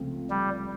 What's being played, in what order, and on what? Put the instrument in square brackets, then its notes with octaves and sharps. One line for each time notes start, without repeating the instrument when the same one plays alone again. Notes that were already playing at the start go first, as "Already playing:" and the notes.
Already playing: [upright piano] C#2 C3 F3 A3 C4
[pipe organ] G3